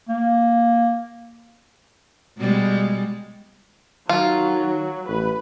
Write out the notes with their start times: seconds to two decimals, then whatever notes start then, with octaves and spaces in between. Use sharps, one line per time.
0.09 A#3
2.37 B2 G3 G#3
4.09 D#3 F#3 F4
5.08 A1 B4